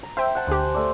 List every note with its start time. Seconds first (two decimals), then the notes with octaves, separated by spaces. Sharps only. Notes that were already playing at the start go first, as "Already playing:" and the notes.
0.03 A#5
0.17 C5 E5 G5
0.35 F#5 A5
0.47 D2 G4 G#5
0.74 A3 D5